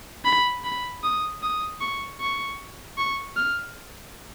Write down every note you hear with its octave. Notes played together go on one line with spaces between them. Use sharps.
B5
B5
D#6
D#6
C#6
C#6
C#6
F6